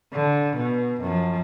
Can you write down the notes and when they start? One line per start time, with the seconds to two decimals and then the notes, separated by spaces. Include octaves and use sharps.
0.13 D3
0.56 B2
1.01 F#2 F3